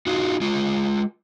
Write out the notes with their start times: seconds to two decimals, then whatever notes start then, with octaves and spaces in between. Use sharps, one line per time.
0.07 D#4 F4 F#4
0.41 G#3 F4